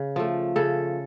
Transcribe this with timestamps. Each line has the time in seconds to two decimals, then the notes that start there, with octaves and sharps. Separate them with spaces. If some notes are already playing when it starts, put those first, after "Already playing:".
Already playing: C#3
0.16 F3 A3
0.56 C#3 A4